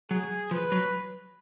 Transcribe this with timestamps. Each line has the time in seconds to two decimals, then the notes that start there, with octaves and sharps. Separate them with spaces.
0.10 F#3 G#4
0.51 F3 B4
0.72 F#3